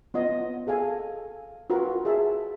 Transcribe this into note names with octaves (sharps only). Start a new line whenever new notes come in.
B3 F4 D#5
G#4 A4 F5 G#5
F4 F#4 A#4 B4
G#4 E5 A5